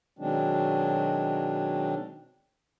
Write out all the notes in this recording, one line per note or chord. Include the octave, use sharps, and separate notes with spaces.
B2 D#3 F#3 G#3 C4 D4